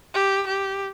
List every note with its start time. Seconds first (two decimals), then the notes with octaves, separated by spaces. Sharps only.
0.14 G4
0.47 G4